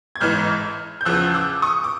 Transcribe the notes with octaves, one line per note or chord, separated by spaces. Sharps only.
G#6
A1 G#2 E3 F6 G6
G6
E2 C#3 F3 E6 F#6
D6 E6
C#6 D#6
D6